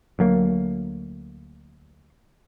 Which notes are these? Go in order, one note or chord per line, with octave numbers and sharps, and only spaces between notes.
D2 F#3 A#3